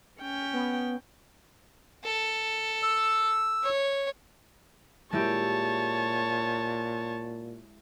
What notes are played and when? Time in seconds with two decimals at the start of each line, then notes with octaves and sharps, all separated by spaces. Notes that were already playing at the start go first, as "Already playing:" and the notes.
0.20 C#4 G5
0.53 B3
2.04 A4
2.83 E6
3.63 C#5
5.13 A#2 G#3 E4 G4 C#5 A5